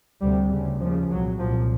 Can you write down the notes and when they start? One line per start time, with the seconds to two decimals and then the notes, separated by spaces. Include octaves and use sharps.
0.21 D2 C3 G3
0.50 D2 C#3
0.80 D#2 C#3 F3
1.09 C2 F#3
1.14 A#2
1.38 C2 A#2 F3